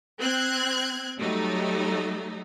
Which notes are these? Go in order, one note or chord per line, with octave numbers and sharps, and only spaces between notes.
C4 F#6 G#6
F#3 G3 A3 D#4